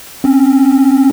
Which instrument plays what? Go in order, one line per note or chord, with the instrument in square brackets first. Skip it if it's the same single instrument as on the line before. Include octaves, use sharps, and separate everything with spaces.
[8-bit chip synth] C4 C#4